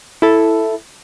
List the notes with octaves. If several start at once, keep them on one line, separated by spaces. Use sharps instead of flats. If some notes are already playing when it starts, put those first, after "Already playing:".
E4 A4